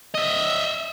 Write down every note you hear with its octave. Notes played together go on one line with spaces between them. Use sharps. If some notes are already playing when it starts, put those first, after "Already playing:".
D#5 E5